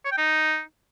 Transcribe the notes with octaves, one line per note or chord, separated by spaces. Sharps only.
C#5
G5
D#4